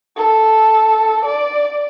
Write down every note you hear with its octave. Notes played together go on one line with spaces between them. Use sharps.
A4
D5